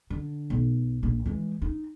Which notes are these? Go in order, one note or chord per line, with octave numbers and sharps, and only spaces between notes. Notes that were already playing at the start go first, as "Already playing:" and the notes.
D3
B1
A#1
E3 G#3
D#4